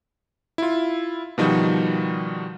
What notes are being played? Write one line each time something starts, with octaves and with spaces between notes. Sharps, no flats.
E4 F4
B2 D#3 F3 G3 D#4 F#4